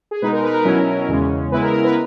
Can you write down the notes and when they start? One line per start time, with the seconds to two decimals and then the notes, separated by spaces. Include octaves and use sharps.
0.11 G#4
0.22 B2 G#3 D#4 B4
0.33 A#4
0.43 B4
0.54 A#4
0.65 B2 F#3 C#4 E4
1.08 E2 C#3 G#3 C#4
1.51 C#3 G#3 B3 E4 B4
1.62 A#4
1.73 A#4
1.84 B4